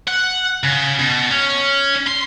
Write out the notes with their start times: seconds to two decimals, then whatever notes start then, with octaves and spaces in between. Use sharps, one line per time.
0.08 F#5
0.64 C#3
0.99 B2
1.31 C#4
2.07 C6